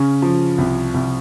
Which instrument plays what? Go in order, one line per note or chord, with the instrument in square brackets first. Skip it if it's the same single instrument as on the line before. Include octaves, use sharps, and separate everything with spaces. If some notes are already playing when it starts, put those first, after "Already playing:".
Already playing: [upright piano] C#3 C#4
F3
C2
C2